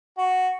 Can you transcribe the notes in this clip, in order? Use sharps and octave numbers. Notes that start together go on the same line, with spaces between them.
F#4